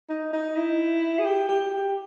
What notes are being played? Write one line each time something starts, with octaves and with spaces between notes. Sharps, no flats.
D#4
D#4
E4
G#4
G4
G4
G4